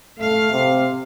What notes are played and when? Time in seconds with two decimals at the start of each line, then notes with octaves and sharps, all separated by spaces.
0.19 A3 F5
0.52 C3